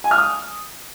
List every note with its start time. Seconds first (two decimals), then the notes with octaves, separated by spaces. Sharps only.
0.04 G#5
0.11 F6
0.18 D#6